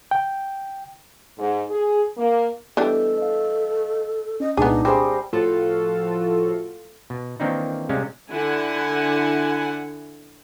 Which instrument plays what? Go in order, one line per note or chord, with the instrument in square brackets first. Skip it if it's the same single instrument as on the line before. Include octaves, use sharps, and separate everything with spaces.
[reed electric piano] G5
[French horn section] G#2
G#4
A#3
[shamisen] E3 G3 D4 [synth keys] B3 D#5 [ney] A4
[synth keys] D#5 F5
[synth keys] C#4 [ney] D#5
[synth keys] C2 A#2 G#3 [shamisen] B3 G#4 [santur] D4 [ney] D#4
[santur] G3 C5 D#6 [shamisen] C4 [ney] G#4 [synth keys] G#5 A#6
[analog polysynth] A2 F3 F4 F#4 A4
[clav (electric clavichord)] B2
D#3 E3 A#3 C4 D4 D#4
C3 G3 G#3 C#4 F5
[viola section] D3 E4 F#5 G#5